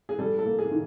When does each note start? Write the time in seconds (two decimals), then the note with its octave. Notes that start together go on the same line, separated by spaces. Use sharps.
0.09 G#4
0.19 G3 A4
0.39 A4
0.46 A#3
0.59 G#4
0.71 D#3